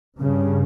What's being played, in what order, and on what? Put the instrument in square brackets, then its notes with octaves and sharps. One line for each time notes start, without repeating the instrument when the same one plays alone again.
[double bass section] G2 C#3